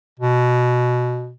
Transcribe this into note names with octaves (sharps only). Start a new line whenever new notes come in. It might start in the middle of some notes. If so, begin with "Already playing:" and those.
B2